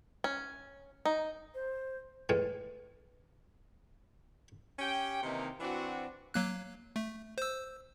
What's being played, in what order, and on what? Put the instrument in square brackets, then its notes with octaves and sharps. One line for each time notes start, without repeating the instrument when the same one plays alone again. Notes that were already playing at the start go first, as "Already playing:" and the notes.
[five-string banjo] C#4
D#4
[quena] C5
[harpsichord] A2 G#3 [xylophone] B4
[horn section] C#4 G4 G5
C3 D#3 E3 A#3 D#4
E3 C4 D4 F#4
[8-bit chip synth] F#3 A#3 F#6
A3
C5 E6